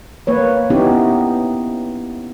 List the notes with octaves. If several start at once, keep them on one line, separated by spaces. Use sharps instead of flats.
A#3 B4 C#5
B3 C#4 D#4 E4 G4